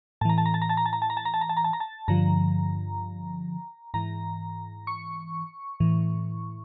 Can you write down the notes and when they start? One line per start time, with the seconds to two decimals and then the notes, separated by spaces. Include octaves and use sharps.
0.21 A2 A5
0.25 E3 A#5
0.38 A5
0.46 A#5
0.54 A5
0.62 A#5
0.69 A5
0.77 A#5
0.86 A5
0.93 A#5
1.02 A5
1.10 A#5
1.17 A5
1.25 A#5
1.34 A5
1.41 A#5
1.49 A5
1.57 A#5
1.64 A5
1.73 A#5
1.80 A5
2.08 G2 D3 F3 A#5
3.94 G#2 E3 A#5
4.87 C#6
5.80 A2 E3